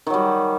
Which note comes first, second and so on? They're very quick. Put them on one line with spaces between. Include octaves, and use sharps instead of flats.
D#3 F#3 G3